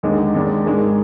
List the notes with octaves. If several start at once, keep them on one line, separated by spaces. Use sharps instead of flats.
D#2 D3 G#3 D#4 G#4
D#2 D#3 G#3 D4
G#2 D#3 G#3 D4 G#4